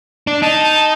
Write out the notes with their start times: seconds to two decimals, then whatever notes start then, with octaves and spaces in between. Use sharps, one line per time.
0.27 D4
0.42 D#4 A5
0.63 A5